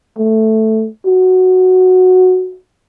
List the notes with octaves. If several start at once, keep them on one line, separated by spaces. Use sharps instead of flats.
A3
F#4